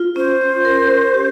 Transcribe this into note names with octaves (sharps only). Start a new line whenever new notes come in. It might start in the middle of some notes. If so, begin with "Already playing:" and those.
Already playing: F4
C#4 C5
C#4
A#4
C#4
G4